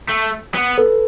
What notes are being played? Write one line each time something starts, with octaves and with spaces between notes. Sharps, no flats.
A3
B3
A4 B4